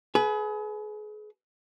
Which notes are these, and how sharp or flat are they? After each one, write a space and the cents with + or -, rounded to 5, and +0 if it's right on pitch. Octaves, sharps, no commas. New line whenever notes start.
G#4 +35 B4 +0